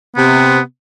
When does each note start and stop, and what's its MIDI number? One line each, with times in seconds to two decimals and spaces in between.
0.16 0.57 48
0.16 0.60 59